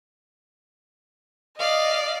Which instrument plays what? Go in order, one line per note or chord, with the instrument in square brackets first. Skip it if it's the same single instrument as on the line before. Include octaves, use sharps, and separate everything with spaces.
[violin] D5 F5 [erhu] D#5